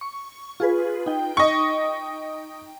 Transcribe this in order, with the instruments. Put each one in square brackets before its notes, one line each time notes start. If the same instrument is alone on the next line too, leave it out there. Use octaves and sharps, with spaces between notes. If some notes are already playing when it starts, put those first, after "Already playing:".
[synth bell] C#6
F4 G#4 B4
D#4 G5
[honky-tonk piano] D#5 C#6